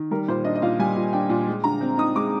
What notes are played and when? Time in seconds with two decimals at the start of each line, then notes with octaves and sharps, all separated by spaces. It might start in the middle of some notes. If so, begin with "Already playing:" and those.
Already playing: D#3
0.11 G3 A#4
0.28 A#2 C5
0.44 D4 D#5
0.55 D#5
0.62 A#2 F5
0.79 G3 G#5
0.96 A#2
1.13 D4 G5
1.30 A#2
1.47 G#3
1.64 D3 A#5
1.81 C4
1.98 D#4 D#6
2.16 G#3 D6